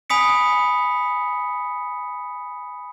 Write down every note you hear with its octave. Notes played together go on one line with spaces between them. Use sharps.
G#5 B5 D#6 B6 C#7